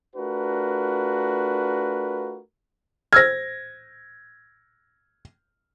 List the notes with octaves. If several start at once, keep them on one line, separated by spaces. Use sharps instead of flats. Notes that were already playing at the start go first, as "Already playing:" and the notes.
A3 D4 F4 F#4 A#4 B4
C5 E6 F6 G#6 A#6